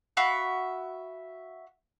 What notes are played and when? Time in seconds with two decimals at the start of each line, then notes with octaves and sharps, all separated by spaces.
0.17 F#4 E5 F5 B5